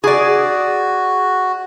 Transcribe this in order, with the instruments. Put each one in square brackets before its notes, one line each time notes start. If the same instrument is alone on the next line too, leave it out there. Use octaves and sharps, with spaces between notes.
[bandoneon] F#4 [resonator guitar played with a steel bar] G#4 D5